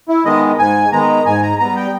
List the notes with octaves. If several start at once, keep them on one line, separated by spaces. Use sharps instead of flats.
E4
D#3 G#3 B3 D#5
G#2 G#5
D#3 G#3 B3 A#5
G#2 G#5
A#5
G3 B3 A#5
G5